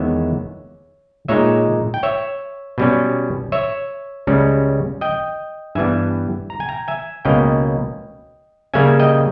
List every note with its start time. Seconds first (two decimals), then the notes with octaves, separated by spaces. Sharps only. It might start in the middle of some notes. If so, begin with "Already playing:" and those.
Already playing: E2 D#3 G#3 B3 C#5 E5
1.28 A#2 G#3 D#4 C#5 E5
1.94 G5
2.03 C#5 E5
2.78 B2 G3 C#4
3.52 C#5 E5
4.27 C#2 C#3 G3 C#4
5.01 D#5 G5
5.75 G2 E3 G3 B3 E5 G#5
6.50 A#5
6.60 G#5
6.68 G5 A#5
6.88 E5 G#5
7.25 C#2 B2 A#3 C#4 D#5 G5
8.74 C#3 G3 A#3 C#4 E5 G#5
9.00 D#5 G5